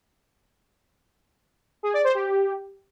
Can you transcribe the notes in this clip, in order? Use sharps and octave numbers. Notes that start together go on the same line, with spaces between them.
G#4
D5
C5
G4